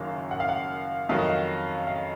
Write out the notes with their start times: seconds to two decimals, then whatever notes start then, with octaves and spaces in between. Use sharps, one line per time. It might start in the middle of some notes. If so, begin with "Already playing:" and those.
Already playing: F#1 F#2 D#3 F#3 F5
0.31 F#5
0.40 F5
0.49 F#5
1.09 F2 D#3 F#3 F5
1.19 D#5
1.29 F5
1.87 F5